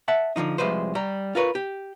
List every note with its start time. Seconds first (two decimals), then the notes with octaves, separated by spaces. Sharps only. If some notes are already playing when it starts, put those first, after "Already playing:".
0.08 E5 F#5 A5
0.36 D3 D#3 F3 D#4
0.58 C2 F3 G#3 B4 C5
0.95 G3 A#5
1.35 F4 A#4 B4 C#5
1.55 G4